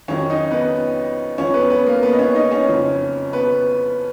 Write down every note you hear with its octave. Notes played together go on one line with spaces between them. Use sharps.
F2 D#3 F#3 C#4 C#5
D#4 D#5
B3 B4
F2 F3 C#4 C#5
B3 B4
B3 B4
A#3 A#4
B3 B4
D#5
C#4 C#5
D#4 D#5
C#4 C#5
F#1 F2 F3
B3 B4